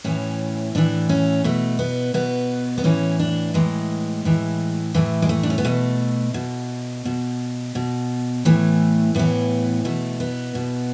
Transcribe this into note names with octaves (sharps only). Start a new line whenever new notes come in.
A2 E3 C#4
A2 E3 D4
C#4
B2 A3
B3
B2 B3
B3
A2 E3 C#4
D4
A2 E3 G#3
A2 E3
A2 E3 A3
G#3
A3
D4
C#4
B3
B2 A3
B2
B2
B2
A2 E3 A3
A2 E3 B3
B2 A3
B3
B2